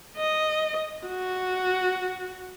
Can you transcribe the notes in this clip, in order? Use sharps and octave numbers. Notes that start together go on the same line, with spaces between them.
D#5
F#4